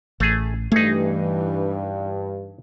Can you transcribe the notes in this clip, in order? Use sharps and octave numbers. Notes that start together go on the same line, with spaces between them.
A1 A3 G#4
G2 E3 G3 A3 D#4 G#4